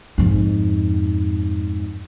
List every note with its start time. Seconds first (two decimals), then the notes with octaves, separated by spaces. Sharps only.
0.18 F2 G#2